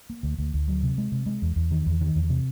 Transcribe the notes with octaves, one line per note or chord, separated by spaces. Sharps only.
A#3
D2
D2
D2
F#3
C3
G#3
C3
G#3
E2
E2
D#3
E2
D#3
E2
C3